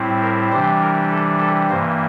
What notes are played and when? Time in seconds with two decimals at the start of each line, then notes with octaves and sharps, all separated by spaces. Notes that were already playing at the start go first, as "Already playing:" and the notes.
Already playing: A2 G3 C4 E4
0.22 A#4
0.51 C3 E3 G3 D4 C5
0.82 A#4
1.11 A4
1.40 A4
1.70 G2 E3 A#3 C5